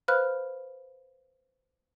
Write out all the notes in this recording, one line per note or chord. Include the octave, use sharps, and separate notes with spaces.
B4 C5 F5 B5 F6 F#6